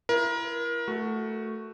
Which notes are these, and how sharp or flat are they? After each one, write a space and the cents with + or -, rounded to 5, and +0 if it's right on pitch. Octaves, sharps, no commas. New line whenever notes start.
E4 +35 A#4 +30
A3 +0 F#4 +0